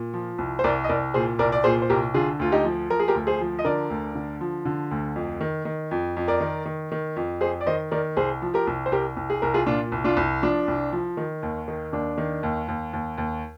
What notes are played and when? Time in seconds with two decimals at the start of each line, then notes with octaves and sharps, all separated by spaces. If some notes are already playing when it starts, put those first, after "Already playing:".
Already playing: A#2
0.14 F3
0.38 C2
0.59 C5
0.64 C2 A#4 D5
0.84 D#5
0.89 C2 A#4 D5
1.14 A#2 G#4 C5
1.39 C2 A#4 D5
1.52 D5
1.64 A#2 G#4 C5
1.82 C5
1.90 C2 G4 A#4
2.14 D3 F4 G#4
2.39 D2 F4
2.52 D#4 G4
2.64 F3
2.90 F3 A#4
3.00 G#4
3.08 G4 A#4
3.15 D2
3.27 G#4 C5
3.41 F3
3.59 D#5
3.65 D3 A#4 D5
3.90 D2
4.15 D3
4.41 F3
4.65 D3
4.91 D2
5.16 F2
5.41 D#3
5.65 D#3
5.91 F2
6.17 F2
6.28 A#4 D5
6.40 D#3
6.65 D#3
6.92 D#3
7.16 F2
7.41 F2 G#4 C5
7.61 D5
7.67 D#3 C5 D#5
7.91 D#3 A#4 D5
8.17 C2 G#4 C5
8.42 F3
8.54 G4 A#4
8.67 C2
8.86 C5
8.92 C2 G4 A#4
9.17 C2
9.30 G#4
9.42 C2 A#4
9.54 F4 G#4
9.67 A#2 D4 F4
9.92 C2
10.04 D4 F4
10.17 C2
10.42 F3 D4
10.68 C2
10.92 F3
11.17 D#3
11.43 D#2
11.68 D#3
11.92 D#2 D4
12.18 D#3
12.43 D#2
12.68 D#2
12.93 D#2
13.18 D#2